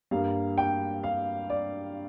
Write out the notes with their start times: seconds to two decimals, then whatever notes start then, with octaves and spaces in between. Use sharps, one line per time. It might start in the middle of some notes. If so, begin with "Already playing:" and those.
0.11 G2 G3 A#3 F5
0.58 G5
1.04 F5
1.50 D5